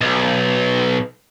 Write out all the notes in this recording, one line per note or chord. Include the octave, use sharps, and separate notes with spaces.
B1